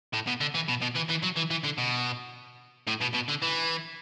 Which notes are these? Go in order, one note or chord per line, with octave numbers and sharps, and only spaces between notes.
A2
B2
D3
E3
B2
B2
E3
E3
F#3
E3
E3
D3
B2
A2
B2
B2
D3
E3